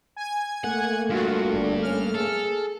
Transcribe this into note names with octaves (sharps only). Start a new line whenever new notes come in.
G#5 G#6
A3 A#3 F#5
G2 F4 F#4
G1 D4
C#4 F6
G#4 A4